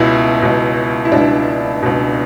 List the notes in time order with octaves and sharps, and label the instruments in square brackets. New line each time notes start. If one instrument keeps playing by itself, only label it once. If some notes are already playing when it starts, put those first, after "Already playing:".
Already playing: [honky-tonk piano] C#2 B2 E4
C#2 B2
E4
C#2 B2 D4
C#2 B2